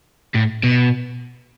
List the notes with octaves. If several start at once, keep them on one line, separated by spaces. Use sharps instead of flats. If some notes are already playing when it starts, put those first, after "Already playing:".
A2
B2